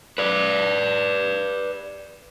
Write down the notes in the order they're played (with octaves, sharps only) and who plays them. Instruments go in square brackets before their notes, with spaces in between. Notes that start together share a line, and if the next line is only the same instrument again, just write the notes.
[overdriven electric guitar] B4 D5